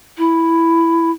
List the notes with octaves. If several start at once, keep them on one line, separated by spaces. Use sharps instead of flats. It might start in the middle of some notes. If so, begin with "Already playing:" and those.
E4